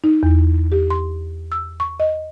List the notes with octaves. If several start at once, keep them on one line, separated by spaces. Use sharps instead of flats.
D#4
E2
G4
C6
E6
C#6
D#5